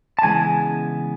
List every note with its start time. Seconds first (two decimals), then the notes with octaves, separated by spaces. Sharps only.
0.19 A5
0.23 C#3 E3 G#3 B3 G#5